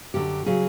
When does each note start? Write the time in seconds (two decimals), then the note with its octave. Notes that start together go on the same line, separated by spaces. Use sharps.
0.14 F#2 D3 F#3 G4
0.46 C#3 F#3 G#4